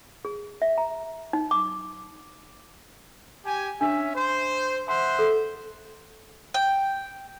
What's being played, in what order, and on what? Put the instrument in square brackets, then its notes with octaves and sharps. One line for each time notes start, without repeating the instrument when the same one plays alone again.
[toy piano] G#4
E5
A#5
D#4
D6
[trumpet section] G4 G#5
[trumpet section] C#4 E5 [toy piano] D4
[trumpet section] C5
[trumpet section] C5 E5 F#5 [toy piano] C6
[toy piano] A4
[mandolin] G5